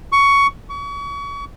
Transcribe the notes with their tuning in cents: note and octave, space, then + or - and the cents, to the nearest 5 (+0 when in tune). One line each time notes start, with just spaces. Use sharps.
C#6 +15
C#6 +35